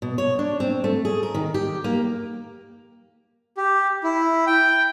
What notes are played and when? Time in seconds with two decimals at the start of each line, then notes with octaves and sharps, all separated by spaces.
0.02 B2
0.18 C#5
0.39 D4
0.60 C4
0.84 A3
1.05 G#4
1.23 A#4
1.34 D#3
1.54 G4
1.84 A#3
3.57 G4
4.04 E4
4.46 G5